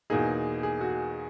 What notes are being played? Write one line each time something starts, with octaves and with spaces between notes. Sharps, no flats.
E2 B2 A#3 D#4 G#4
G#4
F#4
G#4